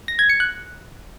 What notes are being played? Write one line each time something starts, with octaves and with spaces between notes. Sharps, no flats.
A#6
G#6
C#7
F#6